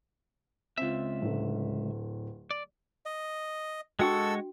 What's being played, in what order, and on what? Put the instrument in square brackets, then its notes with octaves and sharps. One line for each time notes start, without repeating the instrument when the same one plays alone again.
[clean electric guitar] C#2 E5 [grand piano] C4 F4
[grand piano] D1 D3
[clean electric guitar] D5
[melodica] D#5
[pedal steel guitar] G#3 F#5 C#6 [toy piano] D4 F#4 G5 [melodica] A4 E6